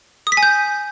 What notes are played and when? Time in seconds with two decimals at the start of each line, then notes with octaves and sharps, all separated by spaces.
0.27 D#6
0.32 B6
0.37 G#5
0.43 G6